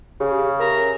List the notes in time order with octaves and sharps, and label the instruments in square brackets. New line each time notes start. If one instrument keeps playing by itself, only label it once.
[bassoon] C#3 [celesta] G4
[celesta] A#4 [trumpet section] E5 A#5